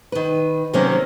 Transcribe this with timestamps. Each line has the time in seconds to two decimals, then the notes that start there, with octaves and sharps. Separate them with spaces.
0.12 D#3 B4
0.73 C3 D#3 F#3 A#3 C4 C#4